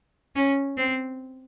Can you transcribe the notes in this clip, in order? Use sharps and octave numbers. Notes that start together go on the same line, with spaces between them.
C#4
C4